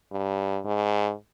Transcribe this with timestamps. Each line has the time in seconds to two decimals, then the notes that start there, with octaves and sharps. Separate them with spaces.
0.12 G2
0.65 G#2